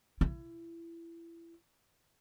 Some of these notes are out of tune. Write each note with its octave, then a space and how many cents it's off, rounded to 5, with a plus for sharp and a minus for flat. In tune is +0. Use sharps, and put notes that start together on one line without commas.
E4 +25